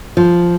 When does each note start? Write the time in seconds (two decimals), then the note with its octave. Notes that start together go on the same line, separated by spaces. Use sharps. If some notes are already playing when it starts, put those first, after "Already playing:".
0.17 F3